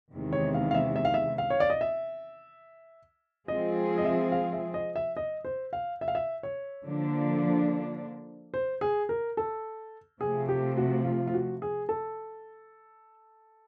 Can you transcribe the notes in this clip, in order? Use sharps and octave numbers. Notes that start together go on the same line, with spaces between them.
E2 C3 D#3 G#3
C#5
F5
F5
E5
E5
F5
E5
F5
C#5
D5
D#5
E5
F3 G#3 C4 F4 G#4 D#5
D#5
E5
F5
E5
D#5
E5
D#5
C5
F5
E5
F5
E5
C#5
D3 F3 A#3 D4
C5
G#4
A#4
A4
C3 F3 A3 G#4
G4
F#4
F4
F4
F#4
G#4
A4